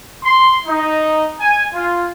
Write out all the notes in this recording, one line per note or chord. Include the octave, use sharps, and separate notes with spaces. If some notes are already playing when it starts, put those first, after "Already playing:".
C6
D#4
G#5
F4